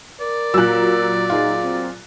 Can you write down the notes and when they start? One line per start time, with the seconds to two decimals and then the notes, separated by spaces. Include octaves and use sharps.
0.20 A#4 D5
0.54 A#2 F#3 E6 F#6
1.30 D#4 F4 G#4
1.63 C4